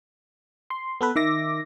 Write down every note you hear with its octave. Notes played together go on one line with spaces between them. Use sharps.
C6
B3 A4 B4
D#3 E5 D6 A#6